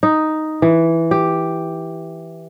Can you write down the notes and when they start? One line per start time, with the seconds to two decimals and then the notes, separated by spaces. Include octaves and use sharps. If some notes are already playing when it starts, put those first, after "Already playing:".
0.03 D#4
0.62 E3
1.11 G4